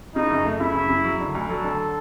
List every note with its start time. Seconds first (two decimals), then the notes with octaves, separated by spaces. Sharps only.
0.15 C#3 D#4
0.30 F#2
0.45 A3
0.60 C#3 E4
0.75 F#2
0.90 C#3
1.05 F#3
1.20 D3
1.35 D2
1.49 F#3 A4
1.64 D3